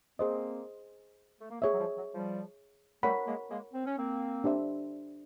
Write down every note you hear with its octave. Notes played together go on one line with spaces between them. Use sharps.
A#3 C4 G#4 C5 D#5
A3
A#3
A3 B3 G#4 C#5 E5
F#3
F3 G3
F#3
F3 G3
G3 A3 A#4 C#5 F#5 B5
G#3 A#3
G#3 A#3
C4
C#4
A#3 C4
D4 G4 C5 E5